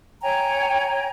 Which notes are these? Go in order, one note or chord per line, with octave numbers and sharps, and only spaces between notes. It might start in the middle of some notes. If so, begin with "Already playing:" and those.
C#5 G5 G#5 A#5